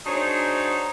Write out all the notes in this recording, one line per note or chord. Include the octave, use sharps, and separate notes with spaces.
D4 D#4 F#4 G#4 C5 C#5